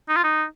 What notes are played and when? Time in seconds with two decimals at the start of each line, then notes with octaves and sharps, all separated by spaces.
0.09 D#4
0.16 F4
0.24 D#4